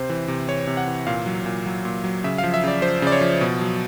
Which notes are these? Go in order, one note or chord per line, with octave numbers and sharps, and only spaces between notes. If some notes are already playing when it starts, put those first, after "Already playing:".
Already playing: C3 C5
E3
C3
E3 C#5
C3
F#5
E3
A#2 F5
F#3
A#2
F#3
A#2
F#3
C#3 E5
F5
F3
E5
C#3 D5
F3 C5
C#3 D5
C#5
F3
B2
F#3